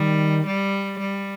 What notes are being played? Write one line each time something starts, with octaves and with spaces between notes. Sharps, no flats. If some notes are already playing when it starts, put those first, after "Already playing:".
Already playing: D#3 G3
G3
G3